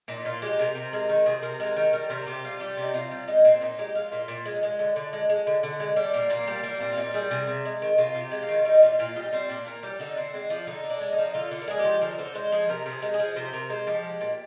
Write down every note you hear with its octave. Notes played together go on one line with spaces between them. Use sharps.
A#2 D#4
A#2 F4
G#3 G4
C3 A#4
C3
G#3 A#4
D#3
C3 G#4
C3 A#4
G#3 A#4
D#3 A#4
G3 A#4
C3 A#4
C3 G4
G3 F4
G3 G4
C3
D#4
C3 F4
G3
G#3 D#4
A#2 C4
A#2 D#4
G#3 G4
G#3 F4
A#2
A#2
G#3
G#3
D3
D3
G#3
G#3
D3
D3
G#3
G3 D4
A#2 A#3
A#2 A#3
G3 A#3
G3 A#3
A#2 C4
F4
A#2 D#4
G3 G#4
C3 G#4
C3
G#3
D#3
C3 F4
C3
G4
G#3
F4
D#3
G3 D#4
A#2 F4
A#2 F4
G3 D#4
G3 C4
A#2 D4
A#2 A#4
G3 G4
D3 D#4
D3 C4
G#3 C4
F3 D4
D3 D#4
D3
D4
G#3
D#4
F3
D3 F4
D3
A#4
G#3 G#4
G4
F3
D3 A#4
D3 C5
G#3 C5
F3 G#4
C3 A#4
C3
G#4
G#3
G#4
F3
C3 C5
C3 A#4
G#3 C5
F3 G4
G#3
A#2